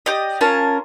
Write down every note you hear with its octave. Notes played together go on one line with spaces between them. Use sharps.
G4 D5 D#5
C#4 F4 A#4 A5